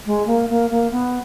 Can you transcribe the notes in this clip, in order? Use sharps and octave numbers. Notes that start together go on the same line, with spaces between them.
G#3
A#3
A#3
A#3
B3